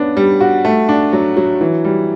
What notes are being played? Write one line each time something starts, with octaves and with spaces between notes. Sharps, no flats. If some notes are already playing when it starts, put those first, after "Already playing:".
Already playing: B3 C#4 D4
G3
F#4
A3
D4
F#3
F#3
E3
G3